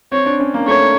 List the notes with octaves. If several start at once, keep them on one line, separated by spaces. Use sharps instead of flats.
C4 C#5
D4
C#4
A#3
A3 C#5